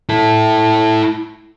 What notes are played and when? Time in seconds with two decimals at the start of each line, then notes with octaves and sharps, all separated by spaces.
0.09 E4 A4